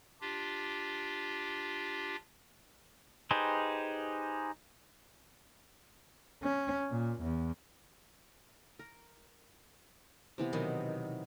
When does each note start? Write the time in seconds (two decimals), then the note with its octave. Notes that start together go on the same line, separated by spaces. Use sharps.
0.21 D4 F4 G4
3.31 D#4 G4 G#4 B4 C5
6.43 C#4
6.91 A#2
7.22 E2
8.79 A#4
10.38 C3 E3 B3
10.53 B2 D#3 F#3